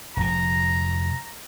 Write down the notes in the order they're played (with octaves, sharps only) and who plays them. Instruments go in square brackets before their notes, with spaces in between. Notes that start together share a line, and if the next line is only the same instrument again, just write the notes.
[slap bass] F1 G#2 [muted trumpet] A#5